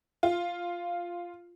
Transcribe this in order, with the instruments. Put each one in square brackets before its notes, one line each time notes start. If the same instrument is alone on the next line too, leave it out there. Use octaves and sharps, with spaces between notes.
[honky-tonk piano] F4